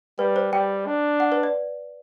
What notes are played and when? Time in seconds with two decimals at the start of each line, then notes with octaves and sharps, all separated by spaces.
0.19 G3 B4
0.36 C5
0.53 G3 G5
0.87 D4
1.20 F#5
1.32 B4
1.43 D5